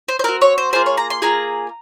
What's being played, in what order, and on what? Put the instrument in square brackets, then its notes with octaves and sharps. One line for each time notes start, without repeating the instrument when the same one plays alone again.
[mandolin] C5
C5
C4 F#4 A#4
C#5
C5
A#3 F4 G#4 C5
C#5
A#5
C6
A#3 F4 G#4 A#5